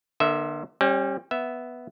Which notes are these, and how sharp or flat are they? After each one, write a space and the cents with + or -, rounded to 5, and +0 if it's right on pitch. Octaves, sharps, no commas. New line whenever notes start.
D3 +35 B3 -45 E5 -10
G3 +0 C#4 -40
B3 +0 E5 +0